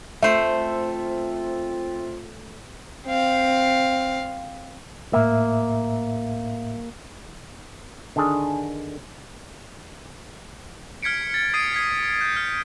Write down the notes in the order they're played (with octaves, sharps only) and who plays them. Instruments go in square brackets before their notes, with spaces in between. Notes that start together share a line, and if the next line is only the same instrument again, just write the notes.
[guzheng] A3 C5 [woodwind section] C4 F4 [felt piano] E5
[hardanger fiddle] C4 F5
[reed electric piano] A2 E5 [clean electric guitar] A#3
[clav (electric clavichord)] D3 D#3 D4 G#4
[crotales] F6 G#6 B6 C#7 D7
A6
D#6 G#6 C7 D7 D#7
G#6 B6 C7
G6
F6